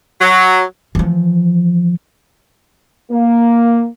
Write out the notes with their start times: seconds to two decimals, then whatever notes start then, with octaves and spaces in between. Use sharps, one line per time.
0.20 F#3
0.95 E3 F3
3.12 A#3